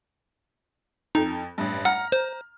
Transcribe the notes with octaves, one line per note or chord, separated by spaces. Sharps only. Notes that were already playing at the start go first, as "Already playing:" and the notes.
F2 D#4 A4
A1 G2
F#5 A#5 F6
C5